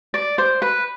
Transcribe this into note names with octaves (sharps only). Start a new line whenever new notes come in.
D5
C5
B4